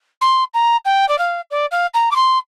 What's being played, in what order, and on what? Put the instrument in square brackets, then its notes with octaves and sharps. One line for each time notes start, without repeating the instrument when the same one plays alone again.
[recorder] C6
A#5
G5
D5
F5
D5
F5
A#5
D6
C6